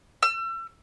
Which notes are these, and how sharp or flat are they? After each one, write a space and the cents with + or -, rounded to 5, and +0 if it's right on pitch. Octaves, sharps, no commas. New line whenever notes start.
E6 +35